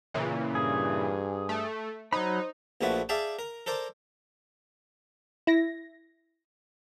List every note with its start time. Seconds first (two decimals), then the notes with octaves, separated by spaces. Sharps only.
0.14 A#2 C#3 E3
0.55 G2 G#4
1.49 A3
2.13 F#3 D#4 C5 B5
2.81 A#1 A#2 F3 A3 F#4 B4
3.09 G#4 D5 E5 F5 G5 A5
3.39 A#4
3.66 A4 A#4 C5 D5
5.47 E4 A#6